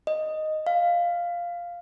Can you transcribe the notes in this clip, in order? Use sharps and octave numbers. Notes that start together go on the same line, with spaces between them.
D#5
F5